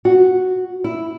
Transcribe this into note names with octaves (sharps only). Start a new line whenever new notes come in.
F#4
E4